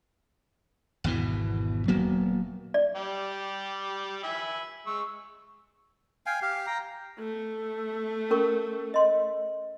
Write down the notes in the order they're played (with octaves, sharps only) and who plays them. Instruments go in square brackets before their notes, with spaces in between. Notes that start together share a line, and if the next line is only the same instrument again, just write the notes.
[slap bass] G#1 E2 B2 E3
D#1 F#3 A#3 B3
[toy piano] D5
[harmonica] G3 G4
E5 G#5 B5
G#3 C#6 E6
[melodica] F5 G5 G#5
G4 F5
G5 A#5
[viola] A3
[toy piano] C#4 A#4 C#6
D#5 C6